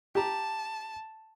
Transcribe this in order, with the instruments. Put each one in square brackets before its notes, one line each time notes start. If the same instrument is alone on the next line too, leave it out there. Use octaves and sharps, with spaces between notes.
[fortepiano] G4 A#5 [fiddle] A5